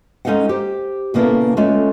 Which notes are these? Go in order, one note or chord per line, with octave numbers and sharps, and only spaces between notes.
G#3 C#4 D#4 A4 F5 F#5
G4 C5
A#2 C#3 A#3 B3 E4 A4
G#3 A3 C#4 F4 A4 C#5